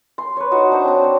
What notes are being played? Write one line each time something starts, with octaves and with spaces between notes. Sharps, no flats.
C6
B4 C#5
D#4 F#4 C#5
D4 C5 A#5
C4 A#5
C#5